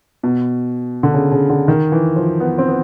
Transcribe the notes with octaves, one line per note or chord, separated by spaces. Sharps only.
B2
D3
C#3
C#3
D3
D#3
E3
F3
B3
C4
B3